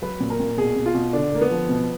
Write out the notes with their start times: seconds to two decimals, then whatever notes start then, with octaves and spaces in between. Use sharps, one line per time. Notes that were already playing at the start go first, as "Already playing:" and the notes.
0.02 F#3 B4
0.20 A#2
0.30 A#4
0.40 A#2
0.57 B2 G#4
0.76 B2
0.86 F4
0.95 B2
1.13 D3 D4
1.32 D3 A#3
1.41 B3
1.51 F3
1.69 B2